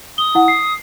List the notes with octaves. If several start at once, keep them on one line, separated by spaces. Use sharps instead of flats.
D#6 G7
E4 F#5
C7